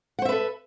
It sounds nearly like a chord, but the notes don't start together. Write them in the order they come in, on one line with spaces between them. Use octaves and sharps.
F#5 C5 E5 B4 A4